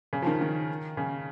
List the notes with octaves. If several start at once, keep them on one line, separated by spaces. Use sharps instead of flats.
C#3
F3
D#3
D#3
C#3